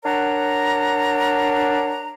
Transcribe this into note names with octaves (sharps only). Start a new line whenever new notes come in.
D4 A#4 C#5 F#5 A#5